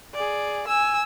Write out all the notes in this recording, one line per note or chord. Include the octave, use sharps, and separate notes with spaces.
G#4 D5
G#5 E6